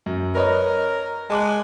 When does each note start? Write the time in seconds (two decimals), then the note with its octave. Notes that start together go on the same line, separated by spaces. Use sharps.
0.06 F#2
0.35 A#4 B4 C#5 D#5
1.30 G#3 A5 D6 F#6